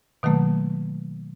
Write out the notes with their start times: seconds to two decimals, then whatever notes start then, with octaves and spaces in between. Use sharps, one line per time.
0.23 B2 D#3 F#3 A3 A#3